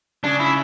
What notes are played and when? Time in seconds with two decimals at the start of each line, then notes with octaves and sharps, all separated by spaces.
0.24 C#3 D4
0.40 E4